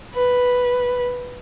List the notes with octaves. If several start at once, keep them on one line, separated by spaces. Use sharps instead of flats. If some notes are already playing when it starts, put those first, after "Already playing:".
B4